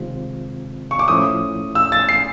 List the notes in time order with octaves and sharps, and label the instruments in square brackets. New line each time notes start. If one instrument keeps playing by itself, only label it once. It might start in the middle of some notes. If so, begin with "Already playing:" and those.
Already playing: [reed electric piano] C3 D#3 G#3 C4 F4
[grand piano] C#6
D6
[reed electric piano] A2 F3 A3 C#4 E4 [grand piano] D#6
[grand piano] E6
A6
C7